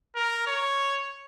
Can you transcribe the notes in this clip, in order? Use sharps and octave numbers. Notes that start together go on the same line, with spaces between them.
A#4
C#5